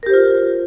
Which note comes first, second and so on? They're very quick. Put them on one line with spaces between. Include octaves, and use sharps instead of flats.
A#4 G4 C5 F4